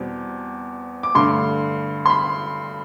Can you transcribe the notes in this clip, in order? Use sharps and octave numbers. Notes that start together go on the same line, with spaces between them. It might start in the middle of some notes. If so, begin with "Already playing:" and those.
Already playing: E2 B2 G3 C4
D6
G2 D3 A3 C6
C6
B5